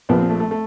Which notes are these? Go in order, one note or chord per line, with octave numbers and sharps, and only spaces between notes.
A#1 A#2 F3 B3
C4
A3
A3
A3